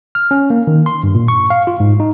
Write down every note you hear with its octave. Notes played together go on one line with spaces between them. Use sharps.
F6
C#4
A#3
D#3
C6
G2
A#2
C#6
F5
F4
G#2
D#4